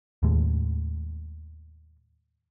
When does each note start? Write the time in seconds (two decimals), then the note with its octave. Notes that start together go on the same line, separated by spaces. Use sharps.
0.23 D#2 A2 G#3